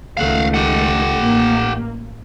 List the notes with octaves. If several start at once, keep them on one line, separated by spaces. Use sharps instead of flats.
C#2 D#3 A3 F5 F#5
G4 F#5
A1 A#3